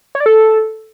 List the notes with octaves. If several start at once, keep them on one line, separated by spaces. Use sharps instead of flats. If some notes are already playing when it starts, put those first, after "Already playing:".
C#5
D5
A4